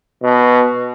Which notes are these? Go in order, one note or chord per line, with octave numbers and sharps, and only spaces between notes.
B2